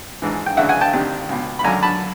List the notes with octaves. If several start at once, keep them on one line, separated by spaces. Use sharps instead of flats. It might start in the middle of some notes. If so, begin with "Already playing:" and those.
G#1 G#2 E3
G5
D2 C#3 E3 E5 F#5
F#5 G#5
G5 A5
D2 C3 D#3
C#2 B2
B5
G#1 F#2 D3 G#5 A#5
A5 B5